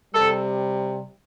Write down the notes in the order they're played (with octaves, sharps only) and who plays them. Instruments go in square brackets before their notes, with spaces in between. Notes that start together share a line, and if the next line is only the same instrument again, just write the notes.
[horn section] C3 G3 A4